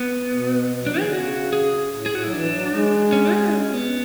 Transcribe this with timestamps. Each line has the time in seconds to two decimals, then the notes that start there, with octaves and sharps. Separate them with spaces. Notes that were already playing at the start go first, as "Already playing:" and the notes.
Already playing: B3
0.32 B2
0.81 F#3
0.87 D4
0.92 E3
1.00 D3 G#4
1.12 C#3 F#4
1.53 G#4
1.93 A2
2.06 G#4
2.13 A2 F#4
2.24 F#3 E4
2.33 E3 D4
2.53 F#3
2.73 G#3
3.13 C#4
3.33 G#4
3.53 C#4
3.73 B3